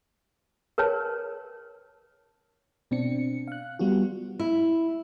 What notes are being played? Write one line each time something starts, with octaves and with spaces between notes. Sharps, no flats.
A#4 B4 C#5 A5
B2 C4 D4 C#7
F5 F#6
G3 B3 F4 F#4
E4